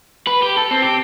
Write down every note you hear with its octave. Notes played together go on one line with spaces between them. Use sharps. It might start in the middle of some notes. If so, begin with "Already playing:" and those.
B4
G4
A4
C4
G4